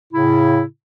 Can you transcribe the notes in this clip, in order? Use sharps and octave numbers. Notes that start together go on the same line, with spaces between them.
A2 C#3 E4